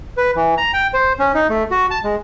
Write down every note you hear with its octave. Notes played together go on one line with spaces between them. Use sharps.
B4
E3
A#5
G5
C5
C#4
D#4
A3
F#4
A5
G#3